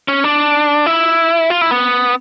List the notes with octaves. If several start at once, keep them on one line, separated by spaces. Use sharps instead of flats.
C#4
D4
E4
F4
E4
B3